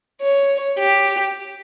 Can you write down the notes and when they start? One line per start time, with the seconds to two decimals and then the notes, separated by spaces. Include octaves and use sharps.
0.21 C#5
0.79 G4